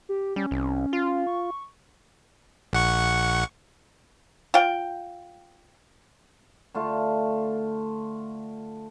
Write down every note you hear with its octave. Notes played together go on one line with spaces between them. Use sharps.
G4
G3 C#4
C2
F4
C#6
A#1 F#5 C#6
F4 G5
D3 A3 F4